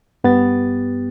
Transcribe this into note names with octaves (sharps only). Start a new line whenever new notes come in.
G2 B3 G4 A6